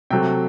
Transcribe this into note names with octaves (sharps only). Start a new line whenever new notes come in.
C3 F#3 A3 G5